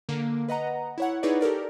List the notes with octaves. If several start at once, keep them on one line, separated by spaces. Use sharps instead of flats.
D3 A#3
B4 D#5 F#5 A#5
E4 C#5 F#5
D#4 E4 G#4 B4 C#5 D5
G4 A4 A#4 D5